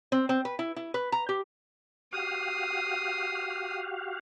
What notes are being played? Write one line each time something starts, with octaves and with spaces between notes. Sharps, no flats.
C4
C4
B4
E4
E4
B4
A#5
G4
F#4 G4 F5 D#6 C7